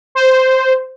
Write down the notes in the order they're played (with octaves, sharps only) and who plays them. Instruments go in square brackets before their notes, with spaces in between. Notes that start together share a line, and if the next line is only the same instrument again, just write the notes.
[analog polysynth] C5